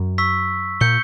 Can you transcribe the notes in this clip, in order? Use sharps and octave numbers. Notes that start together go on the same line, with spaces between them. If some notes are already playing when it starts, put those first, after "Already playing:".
Already playing: F#2
C#6 E6 B6
A#2 G6 C#7 G7